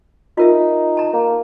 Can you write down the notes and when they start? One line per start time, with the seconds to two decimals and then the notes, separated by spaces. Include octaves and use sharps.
0.37 D#4 F4 A#4 E5
0.97 A5 A#5
1.13 A#3